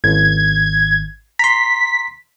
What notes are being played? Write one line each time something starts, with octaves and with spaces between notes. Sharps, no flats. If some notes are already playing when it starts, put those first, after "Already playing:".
G#1 G#6
A#5 C6 B6